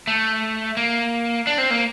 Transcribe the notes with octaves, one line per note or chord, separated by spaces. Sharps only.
A3
A#3
D4
C4
A#3